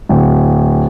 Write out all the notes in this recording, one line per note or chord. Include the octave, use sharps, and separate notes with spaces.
D1